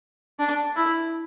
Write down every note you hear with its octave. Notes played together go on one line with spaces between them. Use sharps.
D4
E4